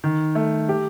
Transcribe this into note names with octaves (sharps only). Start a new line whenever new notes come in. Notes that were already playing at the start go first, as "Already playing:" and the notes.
D#3
A3
G4